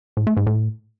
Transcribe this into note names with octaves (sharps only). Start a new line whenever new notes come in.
A2
A3
G#2
A2